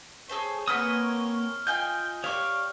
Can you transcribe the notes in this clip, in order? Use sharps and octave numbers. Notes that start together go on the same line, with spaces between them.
G#4 A4 C5 C#5
A#3 C4 B4 F#5 G#5 D#6 F6
F4 D#5 G5 G#5 G6
G4 C#5 D5 F5 C#6 D6